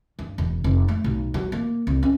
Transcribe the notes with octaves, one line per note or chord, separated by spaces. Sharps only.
G2
E1
F1
A3
B1
F#3
A#3
C2
C#4